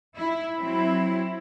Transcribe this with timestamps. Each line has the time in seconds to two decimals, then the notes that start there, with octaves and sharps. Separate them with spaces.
0.16 E4
0.59 F#3 C4 E4